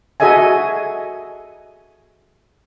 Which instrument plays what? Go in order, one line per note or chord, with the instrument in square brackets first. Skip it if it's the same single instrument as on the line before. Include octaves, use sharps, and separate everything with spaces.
[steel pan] F#4 G#4 A4 D#5 E5 G#5